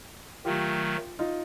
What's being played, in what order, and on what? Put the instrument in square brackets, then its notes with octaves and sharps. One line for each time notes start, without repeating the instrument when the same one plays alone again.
[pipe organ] D#3 F#3 A3 [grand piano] F4 G4
[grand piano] D#4 F4